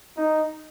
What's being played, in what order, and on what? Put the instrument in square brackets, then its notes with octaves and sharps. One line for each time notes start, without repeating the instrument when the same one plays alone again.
[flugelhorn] D#4